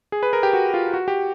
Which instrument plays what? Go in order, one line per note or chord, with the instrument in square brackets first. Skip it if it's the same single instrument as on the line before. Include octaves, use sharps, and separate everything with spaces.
[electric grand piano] G#4
B4
A#4
G4
F#4
F4
F#4
G4